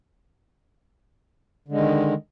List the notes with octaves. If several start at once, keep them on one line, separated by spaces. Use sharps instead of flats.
D3 D#3 G#3